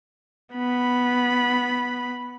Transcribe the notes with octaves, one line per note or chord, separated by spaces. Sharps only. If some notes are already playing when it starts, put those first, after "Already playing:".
B3 B5